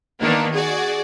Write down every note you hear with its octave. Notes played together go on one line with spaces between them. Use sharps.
D#3 A#3 B3 D4 D#4
F#4 G#4 D5